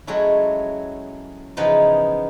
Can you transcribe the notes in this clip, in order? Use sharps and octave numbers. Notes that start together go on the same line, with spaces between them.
F#3 G#3 A3 C#4 E4
C#3 E3 F3 B3 D#4